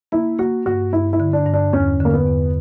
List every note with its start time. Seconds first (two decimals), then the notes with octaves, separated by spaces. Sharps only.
0.12 A#3 E4
0.39 A#3 F#4
0.66 G2 F#4
0.93 G2 E4
1.13 E4
1.20 D3
1.33 D4
1.46 G2
1.53 D4
1.73 E2 C#4
2.00 D3 A#3
2.13 B3
2.27 E2